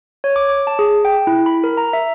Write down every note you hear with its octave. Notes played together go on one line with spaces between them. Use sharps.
C#5
D6
D6
A5
G#4
G5
E4
B5
A#4
A#5
E5